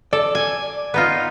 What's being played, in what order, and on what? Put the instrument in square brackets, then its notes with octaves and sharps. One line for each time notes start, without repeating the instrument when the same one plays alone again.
[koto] A4 [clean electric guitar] D5
[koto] G#5
B3 D#4 F4